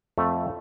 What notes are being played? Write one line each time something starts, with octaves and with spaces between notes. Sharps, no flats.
F2 A3